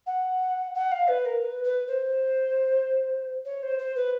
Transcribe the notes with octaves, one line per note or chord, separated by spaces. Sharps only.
F#5
F#5
F5
B4
A#4
B4
B4
C5
C#5
C5
C5
B4